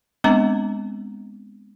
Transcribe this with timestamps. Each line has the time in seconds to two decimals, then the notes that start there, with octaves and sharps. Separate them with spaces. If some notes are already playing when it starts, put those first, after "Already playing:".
0.24 G#3 B3 C4 D4 A#5 D6